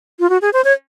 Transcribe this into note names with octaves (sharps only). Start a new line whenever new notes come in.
F4
F#4
G#4
C5
C#5